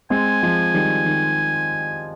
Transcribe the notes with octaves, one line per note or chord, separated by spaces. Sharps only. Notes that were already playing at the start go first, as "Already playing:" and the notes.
G#3 C4 G#5
F3 G#3
D#3 G3
D#3